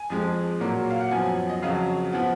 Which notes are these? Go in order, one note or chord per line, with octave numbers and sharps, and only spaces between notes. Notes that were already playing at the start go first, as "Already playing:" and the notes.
Already playing: G#5
F2 F3 G#3
A#2 F#3 A#3
F5
F#5
F#2 F3 B3 G#5
G#5
D#5
F2 C#3 F#3 F5
F3 B3